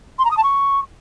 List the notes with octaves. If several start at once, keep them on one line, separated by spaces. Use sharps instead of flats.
C6
A#5
D#6
A5
C#6